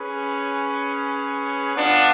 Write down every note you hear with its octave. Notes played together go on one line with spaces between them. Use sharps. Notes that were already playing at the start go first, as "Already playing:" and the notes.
Already playing: C#4 G#4 B4
B3 D4 F4